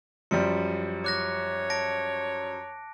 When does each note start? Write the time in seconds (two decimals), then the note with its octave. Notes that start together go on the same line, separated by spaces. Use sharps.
0.31 F#2 F3 G3 C#7
1.04 C#5 D6 F#6 A#6
1.70 A5 A#6 D7